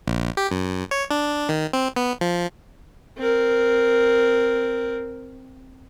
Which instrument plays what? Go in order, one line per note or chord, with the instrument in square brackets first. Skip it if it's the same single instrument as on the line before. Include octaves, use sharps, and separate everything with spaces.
[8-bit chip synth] A#1
G4
F#2
C#5
D4
D#3
C4
B3
F3
[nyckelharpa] C4 A#4